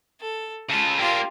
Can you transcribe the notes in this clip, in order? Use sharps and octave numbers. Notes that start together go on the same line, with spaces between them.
A4
C#3 F4 A5
A#3 D4 F4 G4